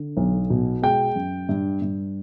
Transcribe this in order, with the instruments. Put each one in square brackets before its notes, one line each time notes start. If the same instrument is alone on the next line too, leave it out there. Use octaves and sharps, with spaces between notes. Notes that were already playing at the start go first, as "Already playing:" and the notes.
Already playing: [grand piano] D3
B1
B2
G#3 G5
F#2
G2
G2